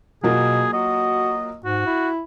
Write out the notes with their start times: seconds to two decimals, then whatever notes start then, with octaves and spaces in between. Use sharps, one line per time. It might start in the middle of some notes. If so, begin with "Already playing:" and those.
0.24 B2 F#3 A#3 F4 G#4
0.73 F#4 D#5
1.65 G#2 F#4
1.86 E4